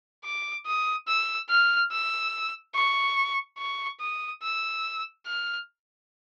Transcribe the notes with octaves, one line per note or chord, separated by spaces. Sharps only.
D6
D#6
E6
F6
E6
C#6
C#6
D#6
E6
F6